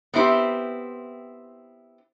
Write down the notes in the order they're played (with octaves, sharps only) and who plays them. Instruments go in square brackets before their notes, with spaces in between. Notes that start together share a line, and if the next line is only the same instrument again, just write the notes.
[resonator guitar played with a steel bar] B3 C4 E4 G4 C5